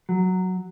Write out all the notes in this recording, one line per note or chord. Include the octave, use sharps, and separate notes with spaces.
F#3